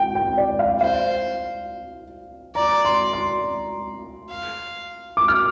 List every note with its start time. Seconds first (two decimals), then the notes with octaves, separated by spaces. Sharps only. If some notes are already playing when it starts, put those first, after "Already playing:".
Already playing: G5
0.15 G5
0.37 D5
0.59 F5
0.81 C5 F5
2.55 D5 A#5
2.85 C6
3.13 C6
4.30 F5
5.17 D6
5.28 F6